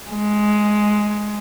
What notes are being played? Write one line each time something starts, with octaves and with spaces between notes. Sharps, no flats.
G#3